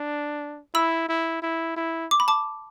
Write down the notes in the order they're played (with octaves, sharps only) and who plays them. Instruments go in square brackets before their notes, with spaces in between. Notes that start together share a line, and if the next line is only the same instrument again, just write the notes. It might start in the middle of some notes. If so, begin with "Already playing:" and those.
Already playing: [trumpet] D4
[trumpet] E4 [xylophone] B5 E6
[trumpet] E4
E4
E4
[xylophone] D6
B5
A5 D6